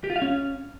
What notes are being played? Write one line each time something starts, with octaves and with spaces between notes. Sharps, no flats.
G4
F4
F5
C#4